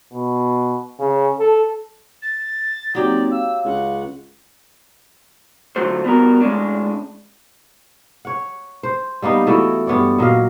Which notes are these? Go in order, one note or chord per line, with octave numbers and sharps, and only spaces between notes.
B2
C#3
A4
A6
F#3 A#3 C4 D#4 G4 D5
F5 E6
C#2 F#5
D3 F#3 A3 F4 F#4 C5
G3 B3 F#4 A#4
A2 G#3 A3 C#4 D4
C#5 F#5
C5
G3 A#3 B3 D#4
E3 A3 E4 F#4
G2 B3 C#5 D5
A#2 F#3 D#5 F5